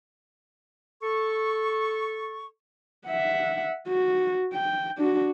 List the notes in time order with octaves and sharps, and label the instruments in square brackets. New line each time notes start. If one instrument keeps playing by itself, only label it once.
[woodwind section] A4 C#6
[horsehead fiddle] E5 F#5
F#4
G5
D4 F#4